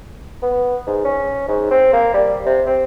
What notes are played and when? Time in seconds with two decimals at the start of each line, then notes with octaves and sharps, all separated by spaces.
0.42 B3
0.87 G#2
1.05 C#4
1.48 G#2
1.71 C4
1.93 A#3
2.14 G3
2.46 C3
2.66 C4